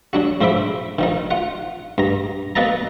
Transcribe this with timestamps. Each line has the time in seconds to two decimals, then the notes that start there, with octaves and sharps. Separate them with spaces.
0.13 F#3 D4 F#4
0.41 G#2 F3 C5 E5 B5 D6
0.99 D#3 F3 D#4
1.31 F4 F#5
1.98 G2 A#5
2.55 A#3 B3 B4 D#5 A5 A#5